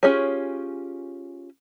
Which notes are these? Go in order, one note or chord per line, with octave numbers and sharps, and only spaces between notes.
C#4 F4 G4 G#4 C#5